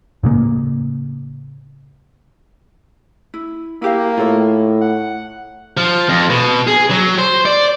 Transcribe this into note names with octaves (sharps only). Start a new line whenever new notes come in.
A2 C#3 A#3
E4
A#3 E4 G4 F5
A2 F4 A4 C#5
F#5
F3
F2
B2
G#4
F#3
C5
D5